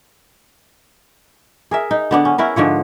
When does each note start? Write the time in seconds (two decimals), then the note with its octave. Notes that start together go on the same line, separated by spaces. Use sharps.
1.71 G#4 A#4 E5
1.91 D#4
2.11 D3 B3 D4
2.25 C#4
2.38 C#4 E4 A#4 B4
2.56 G#2 D3 F3 C#5